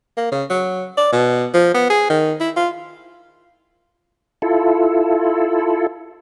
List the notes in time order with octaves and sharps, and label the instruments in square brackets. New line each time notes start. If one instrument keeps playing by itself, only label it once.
[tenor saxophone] A#3
C#3
F#3
D5
B2
F3
B3
G#4
D#3
E4
F4
[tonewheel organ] E4 F4 A4